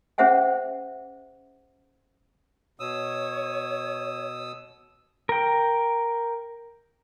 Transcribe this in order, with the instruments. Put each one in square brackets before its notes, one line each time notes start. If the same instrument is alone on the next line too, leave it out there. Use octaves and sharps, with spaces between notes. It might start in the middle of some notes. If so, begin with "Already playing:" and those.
[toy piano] C#4 G#4 C5 E5 F#5 G#5
[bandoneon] B2 D#6 E6 [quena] C#5
[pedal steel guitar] A#4 G5